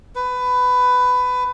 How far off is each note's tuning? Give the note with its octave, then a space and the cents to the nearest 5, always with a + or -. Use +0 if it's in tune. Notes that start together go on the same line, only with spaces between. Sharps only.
B4 +15